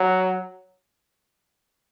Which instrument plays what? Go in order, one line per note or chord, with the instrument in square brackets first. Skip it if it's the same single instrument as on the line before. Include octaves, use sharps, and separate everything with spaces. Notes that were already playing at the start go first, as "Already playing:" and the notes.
Already playing: [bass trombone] F#3